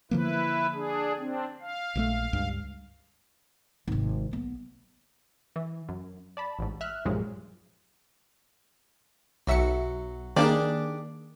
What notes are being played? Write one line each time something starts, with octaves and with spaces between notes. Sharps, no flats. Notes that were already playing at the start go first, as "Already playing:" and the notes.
D3 F3 A#3 E4 B4
D4 G#4
C4 D4
F5
A#1 E3 A3
C#2 G2
G#1 C3
B1 B3
E3
F#2
D5 A5 B5
A1 G#2
E5 F6 F#6
B1 G2 A#2 F3 F#3 G#3
B1 F#3 E5 C#7
D#3 A#3 D4 G4 G#4 D5